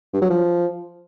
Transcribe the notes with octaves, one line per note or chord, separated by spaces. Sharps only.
G2
F#3
F3